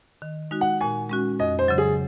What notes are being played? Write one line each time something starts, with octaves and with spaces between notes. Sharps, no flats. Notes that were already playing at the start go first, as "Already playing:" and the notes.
D#3
G#3 D#4 F#4
F#5
A#2 G#5
G#3 C#4 F#4
F2 D#5
C5
C#3 F#3
G#4